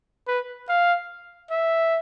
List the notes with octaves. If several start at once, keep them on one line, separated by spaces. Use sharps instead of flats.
B4
F5
E5